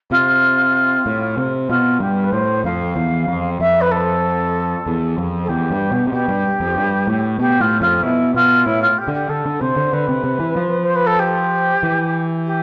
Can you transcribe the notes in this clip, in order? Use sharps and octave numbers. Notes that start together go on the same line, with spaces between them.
C3 F4
A2
C3
B2 F4
G2 G4
B4
A2 C5
F2 F5
E2
F2
F2 E5
B4
A4
E2
F2
A4
E2 G4
G2
B2
C3
B2 G4
G2
F2
G2
A2
B2 G4
A2 F4
F2 F4
B2 E4
B2 F4
A2 E4
F4
G4
D3
G4
D3 A4
D3
C3 C5
D3
D3 B4
C3
C3
E3
F3
C5
B4
A4
G4
E3
G4